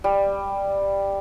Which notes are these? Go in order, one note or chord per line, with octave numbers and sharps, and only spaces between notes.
G3